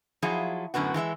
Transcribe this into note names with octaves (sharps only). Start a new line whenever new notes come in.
F3 F#3 E4 F4 G#4
F#2 A2 D3 B3 F#4
E3 G#3 F4 E5